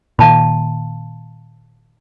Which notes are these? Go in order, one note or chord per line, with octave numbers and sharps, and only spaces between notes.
A#2 D#3 F5 A5 B5